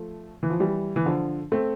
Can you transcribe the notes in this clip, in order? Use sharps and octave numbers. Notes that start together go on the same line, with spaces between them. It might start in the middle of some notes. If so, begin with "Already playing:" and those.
Already playing: F3 A3
E3
F3
E3 G3
E3
D3 F3
A3 C4